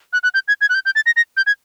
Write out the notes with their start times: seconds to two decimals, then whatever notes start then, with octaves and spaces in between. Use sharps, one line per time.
0.13 F#6
0.23 F#6
0.34 G6
0.48 G#6
0.61 G#6
0.69 F#6
0.74 G6
0.85 G6
0.95 A6
1.06 A#6
1.16 A#6
1.37 G6
1.47 G#6